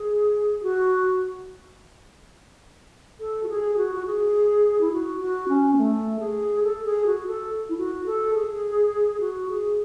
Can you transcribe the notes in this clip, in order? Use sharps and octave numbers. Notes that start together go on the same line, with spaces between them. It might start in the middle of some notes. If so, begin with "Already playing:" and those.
Already playing: G#4
F#4
A4
F#4
G#4
F#4
F#4
G#4
E4
F#4
F#4
C#4
B3
A3
G#4
A4
G#4
F#4
A4
E4
F#4
A4
G#4
F#4
G#4